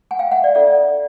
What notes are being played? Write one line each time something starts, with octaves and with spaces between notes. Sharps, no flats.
F#5 G#5
F5 G5
E5 F#5
D5
D4 F4 A4 D5 E5